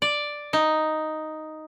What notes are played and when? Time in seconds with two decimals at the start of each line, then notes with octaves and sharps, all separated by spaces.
0.02 D5
0.53 D#4